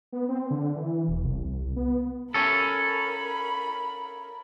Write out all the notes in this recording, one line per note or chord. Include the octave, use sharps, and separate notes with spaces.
B3
C4
D3
E3
E1
C2
B3
C#4 A4 A#4 B5